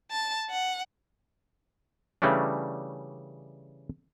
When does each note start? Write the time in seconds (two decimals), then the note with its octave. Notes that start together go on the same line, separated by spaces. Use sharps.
0.11 A5
0.50 F#5
2.22 C#3 E3 G3 A3 C#4 D4